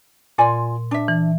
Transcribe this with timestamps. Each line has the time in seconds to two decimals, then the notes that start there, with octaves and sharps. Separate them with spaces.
0.38 A#2 F4 D5 G#5 C6
0.91 D4 E5
1.08 E3